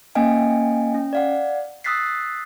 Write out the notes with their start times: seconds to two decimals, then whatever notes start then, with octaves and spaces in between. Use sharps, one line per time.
0.15 A#3 C#4 D#5 F5 G5 G#5
0.94 C#4
1.13 D5 F5 F#5
1.84 D#6 E6 F#6 A6 B6 C7